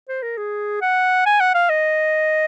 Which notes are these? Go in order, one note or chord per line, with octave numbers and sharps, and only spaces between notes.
C5
A#4
G#4
F#5
G#5
F#5
F5
D#5